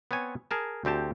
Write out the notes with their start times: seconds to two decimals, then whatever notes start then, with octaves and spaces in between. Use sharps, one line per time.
0.11 B3 C4 C#5 G#5
0.51 G#4 A#4 A5
0.85 D2 C4 G4 A5